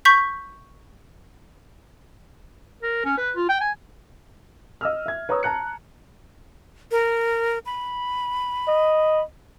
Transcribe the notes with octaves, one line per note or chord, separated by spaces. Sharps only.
C#6 G6 B6
A#4
C#4
B4
F4
G5
G#5
D#5 E6 F6
E5 G#6
B4 C#5 A#5 C#6 D#6 E6
A5 A#5 F#6 C#7
A#4
B5
D#5